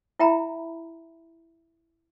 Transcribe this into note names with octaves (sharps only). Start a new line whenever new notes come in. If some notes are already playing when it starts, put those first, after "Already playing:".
E4 E5 G5 A#5 B5